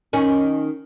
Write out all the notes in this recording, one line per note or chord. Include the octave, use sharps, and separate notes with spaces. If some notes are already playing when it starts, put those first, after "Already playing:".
D#3 C#4